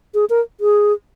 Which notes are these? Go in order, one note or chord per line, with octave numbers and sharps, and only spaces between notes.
G#4
A#4
G#4